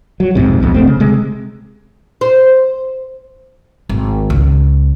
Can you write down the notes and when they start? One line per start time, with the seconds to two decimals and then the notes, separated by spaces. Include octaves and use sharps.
0.20 F#3
0.35 B1 F2 G#2 C3
0.62 B1 F2 B2 B3
0.74 D#1 A3 C4
0.87 C#3
1.00 C3 G#3
2.21 C5
3.89 G#1
4.30 C#2